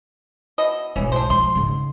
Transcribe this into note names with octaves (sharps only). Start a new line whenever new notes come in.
B2 E4 D#5
B1 G#2 E3 C#4
D4 C5
F3 G#3 C6
G#2 C#3